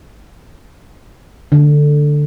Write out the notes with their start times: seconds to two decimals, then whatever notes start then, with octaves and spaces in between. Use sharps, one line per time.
1.52 D3